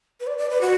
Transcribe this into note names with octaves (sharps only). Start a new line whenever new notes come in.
B4
D5
D5
B4
F#4